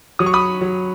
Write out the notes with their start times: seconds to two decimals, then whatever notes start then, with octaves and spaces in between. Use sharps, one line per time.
0.19 F#3 D#6
0.26 C#6
0.34 B5 D#6
0.61 F#3